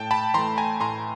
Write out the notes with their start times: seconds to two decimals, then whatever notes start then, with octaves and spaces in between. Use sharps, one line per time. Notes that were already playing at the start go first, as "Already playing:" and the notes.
Already playing: A2 G5 A5
0.11 A5 B5
0.34 E3 A3 A#5 C6
0.58 G#5 A#5
0.80 A2 A#5 C6